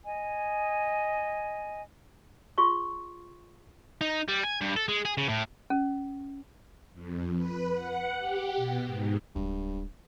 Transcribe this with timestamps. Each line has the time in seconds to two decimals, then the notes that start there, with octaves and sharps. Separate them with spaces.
0.06 D#5 G#5
2.58 F4 G#4 C6 C#6
4.01 D#4
4.28 G3
4.43 G#5
4.61 G2
4.76 A4
4.88 G#3
5.05 G#4
5.18 C#3
5.29 A2
5.70 C#4
6.94 F2
7.36 B4
7.74 F#5
8.19 G4
8.56 B2
8.86 G#2
9.35 D1 G2 G#3